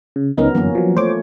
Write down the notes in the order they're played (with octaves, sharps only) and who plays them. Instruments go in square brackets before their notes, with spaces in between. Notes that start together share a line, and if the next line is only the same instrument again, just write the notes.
[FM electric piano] C#3
[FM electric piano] C#2 C#4 D#4 [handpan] F#3 B3 A#4
[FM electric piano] F#2 D3 [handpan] E3 A#3 C#4
[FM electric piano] F3 F#3
[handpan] F3 A3 C#5 [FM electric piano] C5 D6